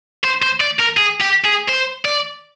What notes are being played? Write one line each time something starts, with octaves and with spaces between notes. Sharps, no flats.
C5
C5
D5
A#4
G#4
G4
G#4
C5
D5